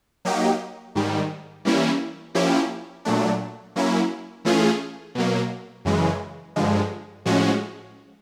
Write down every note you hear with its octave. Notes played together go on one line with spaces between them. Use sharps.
F#3 A#3 D#4 G4
G#2 D#3 G3
E3 G3 A#3 C#4 E4
F3 A#3 C#4 E4 G4
A#2 F#3 A3 D4
F#3 A#3 C#4 E4
E3 A3 C#4 F4 G#4
B2 F#3 A#3
F#2 C#3 E3 G#3
G2 D3 F3 G#3
A2 F3 G#3 C#4 F#4